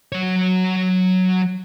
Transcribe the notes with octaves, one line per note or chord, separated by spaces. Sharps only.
F#3 C#5